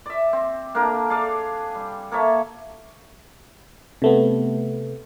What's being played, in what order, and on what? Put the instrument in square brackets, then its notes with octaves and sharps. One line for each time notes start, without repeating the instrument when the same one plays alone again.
[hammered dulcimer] D5 E5
C4
A#3 D4 A4 A#4
G#4 A4 D5 F5
G3
A#3 A4 C#5 E5
[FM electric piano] C3 A3 B3